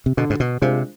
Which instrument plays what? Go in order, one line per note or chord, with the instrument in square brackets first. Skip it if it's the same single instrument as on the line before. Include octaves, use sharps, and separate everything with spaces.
[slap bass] C3
[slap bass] B2 [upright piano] D3
[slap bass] G#2
B2
[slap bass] C3 [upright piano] G#3 D4 F4 C5